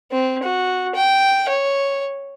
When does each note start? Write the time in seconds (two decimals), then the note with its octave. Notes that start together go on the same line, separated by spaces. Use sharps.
0.12 C4
0.43 F#4
0.95 G5
1.49 C#5